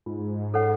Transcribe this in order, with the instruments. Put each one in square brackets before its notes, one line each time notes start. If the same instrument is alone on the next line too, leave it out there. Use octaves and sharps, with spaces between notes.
[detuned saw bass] G#2 [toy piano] F4
[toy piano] A4 C#5 F#5